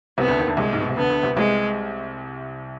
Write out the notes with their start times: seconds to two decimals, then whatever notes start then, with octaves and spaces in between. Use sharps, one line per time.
0.18 C2 C3 B3
0.28 D2 D3
0.37 D#2 D#3
0.48 D2 D3
0.57 C2 C3 G#3
0.73 G#2
0.80 B2
0.89 C3
0.96 D2 D3 B3
1.10 D2 D3
1.23 C2 C3
1.36 C2 C3 G#3